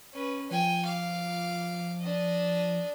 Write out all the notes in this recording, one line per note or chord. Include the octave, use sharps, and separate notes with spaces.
C#4 B4
F3 G5 G#5
F5 D6
D4 D#5